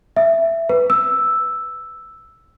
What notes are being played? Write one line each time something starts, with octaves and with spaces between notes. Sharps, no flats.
E5
B4
E6